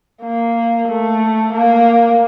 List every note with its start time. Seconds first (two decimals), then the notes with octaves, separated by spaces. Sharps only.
0.23 A#3
0.89 A3
1.53 A#3